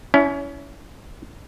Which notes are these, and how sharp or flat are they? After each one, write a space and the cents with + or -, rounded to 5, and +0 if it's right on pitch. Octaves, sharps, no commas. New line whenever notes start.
C#4 +25 E4 +0